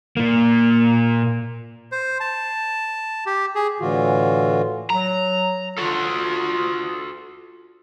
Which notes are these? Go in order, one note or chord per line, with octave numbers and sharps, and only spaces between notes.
A#2 A#3
C5
A5
G4
G#4
A2 D3 E3 F4 F#4
F#3 A#5
F4 F#4 A4